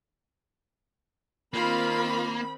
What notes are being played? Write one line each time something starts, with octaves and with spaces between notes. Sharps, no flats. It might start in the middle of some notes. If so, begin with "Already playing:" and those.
D#3 A#3 C4 F4 B5